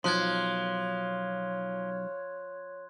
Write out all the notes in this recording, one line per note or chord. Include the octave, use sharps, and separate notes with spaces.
B1 F3 C#5 C6 F#6 G#6